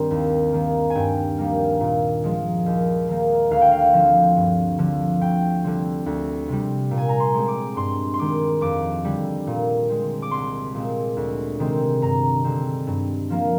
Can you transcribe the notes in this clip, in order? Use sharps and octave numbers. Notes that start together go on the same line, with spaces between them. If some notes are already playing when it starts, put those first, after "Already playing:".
Already playing: G2 D#3 G3 C4
D#2
D#3 A#3
G#5
G2 G5
D#3 G3 A#3
A#2
F3 G#3
D#2
D#3 A#3
D2 F5
G5
F5
D3 F3 C4
G2
D3 F3
D2 G5
D3 G3 C4
D2
C3 G3
A#2
G#5
A#5
C6
G#3 C4
D6
G2 C6
C6
D#3 G#3 D6
F2 D6
D3 G3
A#2
G#3 C4
D6
C2 C6
A#2 G#3 C4
D2
C3 D#3 G#3 C4
G2 A#5
D3 G#3 C4
G2
F3 A#3